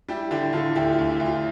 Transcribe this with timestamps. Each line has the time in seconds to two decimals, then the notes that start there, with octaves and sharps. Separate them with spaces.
0.09 G3 E4 G4
0.31 D3 E4 G4
0.53 D3 F4 A4
0.75 D2 E4 G4
0.93 F4
0.99 D2
1.10 E4
1.20 D2
1.25 F4